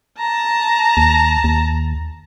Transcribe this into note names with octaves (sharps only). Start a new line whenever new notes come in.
A5 A#5
D#2
D#2